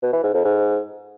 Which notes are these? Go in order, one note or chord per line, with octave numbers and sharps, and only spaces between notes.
B2
E3
G#2
F2
G#2